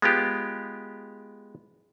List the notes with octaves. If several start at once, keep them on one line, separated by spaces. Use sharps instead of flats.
G#3 B3 F4 G4